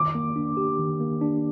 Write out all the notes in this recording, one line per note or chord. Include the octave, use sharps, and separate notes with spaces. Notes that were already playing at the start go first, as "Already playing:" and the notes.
Already playing: D#3 D6
A#3
D4
G4
D#3
A#3
D4